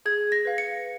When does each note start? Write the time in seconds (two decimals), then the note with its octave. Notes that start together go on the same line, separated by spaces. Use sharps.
0.06 G#4 G#6
0.32 A#6
0.45 B4 F5
0.58 C#7